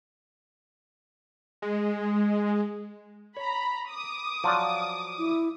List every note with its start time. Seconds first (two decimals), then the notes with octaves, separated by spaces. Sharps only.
1.62 G#3
3.37 C#5 A#5 B5
3.90 D6 D#6
4.44 F3 F#3 D5
5.18 E4